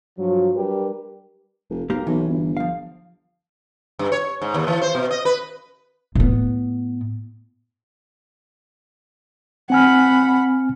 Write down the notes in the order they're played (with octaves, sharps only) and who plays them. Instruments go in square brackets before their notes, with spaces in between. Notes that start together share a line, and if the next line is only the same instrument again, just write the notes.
[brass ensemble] G2 F3 F#3
G3 D4 G4 A#4 B4
[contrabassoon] F1
[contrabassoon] B1 [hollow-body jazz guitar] A#3 G4 A#4
[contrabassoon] B1 [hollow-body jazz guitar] E3
[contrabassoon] G1
[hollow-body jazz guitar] F3 F5
[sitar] G2
C#5
G#2
D#2
E3
C5
B2
D#5
B4
[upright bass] A2 B3
[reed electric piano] C4 G#5 F6 [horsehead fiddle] F#5 B5